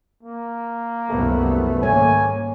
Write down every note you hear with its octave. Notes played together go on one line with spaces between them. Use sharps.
A#3
C2 F#2 A3 B3
G#2 D#3 G3 A#3 C#5 G#5